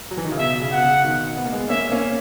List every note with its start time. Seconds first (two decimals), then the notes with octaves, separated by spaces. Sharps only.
0.11 F#3
0.17 E3
0.25 D#3
0.32 C#3
0.39 B2 E5
0.61 C#3
0.72 B2 F#5
0.83 C#3
1.04 B2 D#3
1.37 B3
1.45 A#3
1.53 G#3 B3
1.69 A#3 C#4 E5
1.92 A#3 C#4